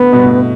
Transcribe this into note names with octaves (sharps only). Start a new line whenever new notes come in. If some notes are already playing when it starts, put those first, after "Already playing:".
Already playing: A2 D3 B3
G2 B2
A2